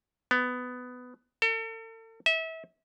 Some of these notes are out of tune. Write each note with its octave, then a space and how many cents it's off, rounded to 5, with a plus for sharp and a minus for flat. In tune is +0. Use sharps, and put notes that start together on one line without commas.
B3 +15
A4 +40
E5 -30